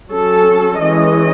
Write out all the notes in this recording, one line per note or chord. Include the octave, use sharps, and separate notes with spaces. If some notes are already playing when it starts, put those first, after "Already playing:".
F#3 C#4 A4
E3 G#3 C#4 D#5